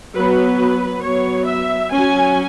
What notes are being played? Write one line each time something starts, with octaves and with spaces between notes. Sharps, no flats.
F#3 B3 B4
F#3 B3 C#5
E5
F#3 C#4 G#5